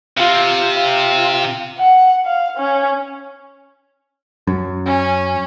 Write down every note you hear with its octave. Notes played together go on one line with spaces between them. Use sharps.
C3 F4
F4
F#5
F5
C#4
F#2
C#4